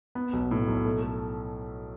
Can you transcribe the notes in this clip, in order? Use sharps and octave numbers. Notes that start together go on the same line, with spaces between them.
B3
B1
A2
B1
A3
A3